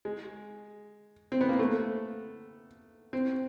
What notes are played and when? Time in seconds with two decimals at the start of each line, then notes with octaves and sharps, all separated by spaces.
0.05 G#3
1.32 C4
1.41 B3
1.49 A#3
1.59 A3
3.13 C4